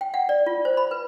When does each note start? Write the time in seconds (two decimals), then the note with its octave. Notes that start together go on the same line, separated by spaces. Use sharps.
0.01 G5
0.14 F#5
0.29 D5
0.46 F4
0.65 C5
0.77 B5
0.91 B4